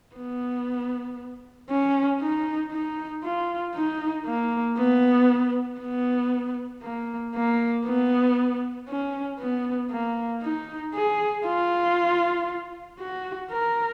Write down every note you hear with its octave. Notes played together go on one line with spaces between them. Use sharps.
B3
C#4
D#4
D#4
F4
D#4
A#3
B3
B3
A#3
A#3
B3
C#4
B3
A#3
D#4
G#4
F4
F#4
A#4